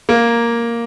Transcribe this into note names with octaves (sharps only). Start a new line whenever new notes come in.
A#3